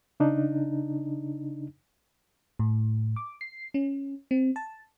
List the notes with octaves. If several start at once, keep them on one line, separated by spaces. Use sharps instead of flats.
C#3 D4 D#4
A2
D6
C7
C#4
C4
A5